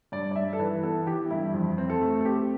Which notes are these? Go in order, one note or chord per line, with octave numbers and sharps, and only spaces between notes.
G2 D5
D5
G2 E5
A4
E3 B4
B3 A4
E3 G4
G2 E4
F2
C4
A4
A3
A4
C4 G4